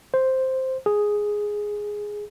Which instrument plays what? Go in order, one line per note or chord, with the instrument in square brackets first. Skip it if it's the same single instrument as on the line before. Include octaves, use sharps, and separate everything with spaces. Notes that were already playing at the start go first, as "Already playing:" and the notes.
[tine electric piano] C5
G#4